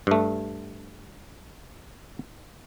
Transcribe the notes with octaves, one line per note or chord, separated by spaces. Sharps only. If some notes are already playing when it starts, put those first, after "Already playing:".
G2 A3